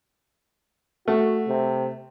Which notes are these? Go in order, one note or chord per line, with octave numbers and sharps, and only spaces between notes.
A3 F#4
C3